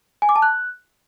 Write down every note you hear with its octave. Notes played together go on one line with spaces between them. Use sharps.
G#5
D6
A5
F#6